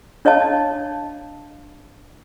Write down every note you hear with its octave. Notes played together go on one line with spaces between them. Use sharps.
D4 C#5 D#5 F5 A5